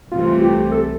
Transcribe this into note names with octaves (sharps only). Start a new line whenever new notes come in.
C2 C3 E3 A3 F4
G4
A4